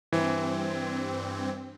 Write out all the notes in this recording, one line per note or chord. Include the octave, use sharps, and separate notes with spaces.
G2 E3 C4